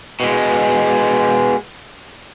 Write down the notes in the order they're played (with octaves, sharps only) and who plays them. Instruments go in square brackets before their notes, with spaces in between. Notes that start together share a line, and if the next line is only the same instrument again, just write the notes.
[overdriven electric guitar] B2 G#3